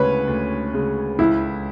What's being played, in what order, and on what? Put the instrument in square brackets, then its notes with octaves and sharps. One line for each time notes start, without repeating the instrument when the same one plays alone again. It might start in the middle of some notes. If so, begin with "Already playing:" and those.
Already playing: [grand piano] D2 C#3 G#3 [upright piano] B4 C#5
[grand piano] D2
C#3 G#3
[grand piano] C#2 [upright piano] E4